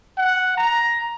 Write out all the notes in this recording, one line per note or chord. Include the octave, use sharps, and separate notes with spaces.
F#5
A#5